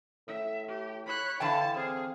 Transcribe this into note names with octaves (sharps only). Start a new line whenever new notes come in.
A2 E5
G4
C#5 B5 F#6
D3 E3 E4 F5 G5 A5
C4 G#4 F5